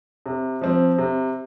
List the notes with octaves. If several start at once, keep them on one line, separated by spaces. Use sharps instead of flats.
C3
F3 C4
C3